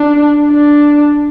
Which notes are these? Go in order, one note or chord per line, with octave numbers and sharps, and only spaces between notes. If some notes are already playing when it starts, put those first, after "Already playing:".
Already playing: D4
D4